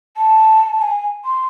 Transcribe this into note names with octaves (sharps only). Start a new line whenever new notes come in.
A5
G#5
C6